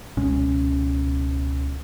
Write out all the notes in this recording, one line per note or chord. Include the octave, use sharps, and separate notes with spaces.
C#2 B2 G#3 C#4